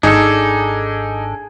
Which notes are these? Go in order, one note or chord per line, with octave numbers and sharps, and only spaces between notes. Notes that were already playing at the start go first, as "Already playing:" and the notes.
G#1 D4 D#4 G#4 A4